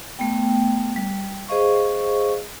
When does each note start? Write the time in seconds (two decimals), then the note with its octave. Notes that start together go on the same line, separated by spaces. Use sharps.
0.19 A3 B3 G5
0.96 G3
1.48 G#4 C5 D#5 F5 C#6